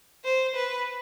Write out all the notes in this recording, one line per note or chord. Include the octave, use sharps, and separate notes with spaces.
C5
B4